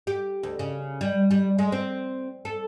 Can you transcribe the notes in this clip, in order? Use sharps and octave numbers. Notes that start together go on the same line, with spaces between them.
G4
D2
C#3
G3
G3
G#3
C4
A4